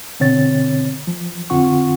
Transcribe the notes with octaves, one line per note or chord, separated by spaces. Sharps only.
B2 D3 C4 C#5 A6
F3
F2 D3 C4 F4 F#5 C#6